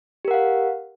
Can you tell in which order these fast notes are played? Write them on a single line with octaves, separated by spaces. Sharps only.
G4 A#4 F#5 F5